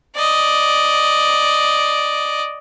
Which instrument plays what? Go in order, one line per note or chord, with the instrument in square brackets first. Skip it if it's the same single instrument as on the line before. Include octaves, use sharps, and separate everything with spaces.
[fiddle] D5 D#5